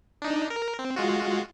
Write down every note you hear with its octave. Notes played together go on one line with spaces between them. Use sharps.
D4 D#4
A#4
C4
G#3 F4 F#4